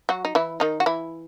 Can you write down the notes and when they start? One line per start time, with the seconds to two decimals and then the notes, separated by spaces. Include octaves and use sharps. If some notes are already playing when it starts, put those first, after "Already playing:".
0.09 F#3 F#4
0.25 D#4
0.35 E3 E4
0.60 D#3 D#4
0.80 F#4
0.86 E3 E4